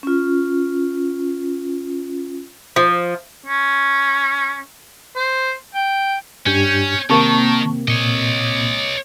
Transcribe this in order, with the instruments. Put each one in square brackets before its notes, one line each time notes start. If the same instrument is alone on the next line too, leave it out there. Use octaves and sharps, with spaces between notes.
[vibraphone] C#4 F4
[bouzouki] F3
[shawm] C#4
C5
G5
[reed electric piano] G2 D4 G4 [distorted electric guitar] C#4 [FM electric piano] G6 G#6
[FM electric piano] C3 A#3 C4 [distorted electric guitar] D#3 [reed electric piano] A5 C#6
[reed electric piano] A#2 [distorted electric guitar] C#5 D#5